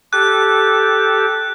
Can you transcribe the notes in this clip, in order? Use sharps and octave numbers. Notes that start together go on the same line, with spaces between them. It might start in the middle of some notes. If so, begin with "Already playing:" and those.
G4 A4 F#6